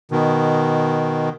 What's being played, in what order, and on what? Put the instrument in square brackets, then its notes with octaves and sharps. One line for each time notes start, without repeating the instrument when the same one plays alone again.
[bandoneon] B2 D#3